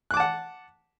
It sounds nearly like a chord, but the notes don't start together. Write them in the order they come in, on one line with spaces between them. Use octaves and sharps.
F#6 D6 A5 F#5